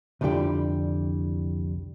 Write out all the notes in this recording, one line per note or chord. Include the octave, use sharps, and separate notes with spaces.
C2 F2 D3 E3 G3 G4